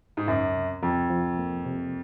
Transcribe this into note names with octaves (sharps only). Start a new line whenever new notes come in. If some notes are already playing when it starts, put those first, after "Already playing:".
G#2
C#2 F#2
C3
F2 F3
F3
A#3
C3